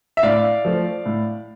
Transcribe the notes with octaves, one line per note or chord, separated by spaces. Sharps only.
E5
A2 D5 F5
F3 A3
A2